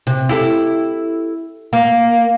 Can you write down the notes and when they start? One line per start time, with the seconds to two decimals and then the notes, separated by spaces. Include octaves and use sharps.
0.07 C3
0.29 E4 G4 A4
1.73 A#3